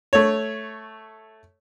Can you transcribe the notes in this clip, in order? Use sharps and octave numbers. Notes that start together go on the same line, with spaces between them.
A3 C#5